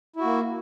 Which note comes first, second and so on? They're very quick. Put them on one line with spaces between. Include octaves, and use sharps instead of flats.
E4 F#4 A#3